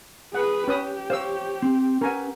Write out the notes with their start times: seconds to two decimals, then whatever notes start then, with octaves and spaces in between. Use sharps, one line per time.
0.34 G#4 B4 F#5
0.68 C#4 G4 B4 D#6
1.10 C5 C#5 F5 E6
1.62 C4
2.01 C#4 A#4 B4 F#5 G#5